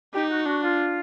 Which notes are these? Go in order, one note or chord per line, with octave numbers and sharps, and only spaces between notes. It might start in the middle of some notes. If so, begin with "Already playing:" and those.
D#4 G4
F#4
D4 F#4
F4